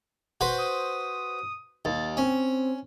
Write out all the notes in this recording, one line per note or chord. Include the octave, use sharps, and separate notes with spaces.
F#4 B4 C5
D#6
D#2 A6
C4 C#4